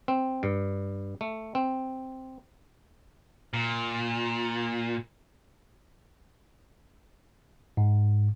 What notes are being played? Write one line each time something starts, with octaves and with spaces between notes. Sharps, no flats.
C4
G2
A3
C4
A#2
G#2